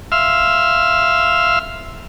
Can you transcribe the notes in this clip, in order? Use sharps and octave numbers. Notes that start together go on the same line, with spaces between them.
E5 F5 C6 E6 F6